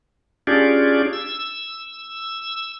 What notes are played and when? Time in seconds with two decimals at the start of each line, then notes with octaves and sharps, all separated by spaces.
0.47 C#4 D4 F4 G4 G#4 D5
1.13 E6